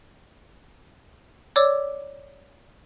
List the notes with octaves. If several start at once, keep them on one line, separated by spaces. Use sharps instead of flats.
C#5 D5 D6 E6